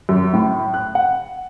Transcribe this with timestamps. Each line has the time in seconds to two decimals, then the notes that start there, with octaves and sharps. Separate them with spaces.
0.09 F#2
0.33 A2
0.74 F#6
0.95 F#5